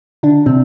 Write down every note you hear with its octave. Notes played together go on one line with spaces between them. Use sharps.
D3 D4
C3 C4